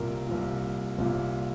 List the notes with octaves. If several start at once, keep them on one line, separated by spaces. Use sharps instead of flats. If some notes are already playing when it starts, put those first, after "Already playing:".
Already playing: C2 A#2 A#4
C2 A#2
C2 A#2